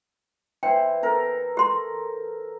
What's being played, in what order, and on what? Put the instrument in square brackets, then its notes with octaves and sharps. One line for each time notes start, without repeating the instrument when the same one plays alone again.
[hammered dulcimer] E3 C5 [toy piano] G5
[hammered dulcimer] A4 A#4
[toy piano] G4 C6